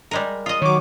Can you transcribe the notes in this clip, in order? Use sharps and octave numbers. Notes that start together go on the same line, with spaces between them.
G3 G#3 A#4
F4 D#5 D#6
D#3 F#3 C#5 D6